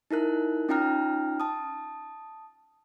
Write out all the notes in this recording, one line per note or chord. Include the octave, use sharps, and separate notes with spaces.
D#4 E4 A#4 F#6
C#4 D#4 F4 G5 A#5 F6
A5 D#6